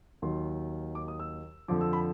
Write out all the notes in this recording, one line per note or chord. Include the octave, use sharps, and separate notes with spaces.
D#2 D#3 F#3 C6
D6
D#6
E6
F2 D3 F3 D6
E6
B5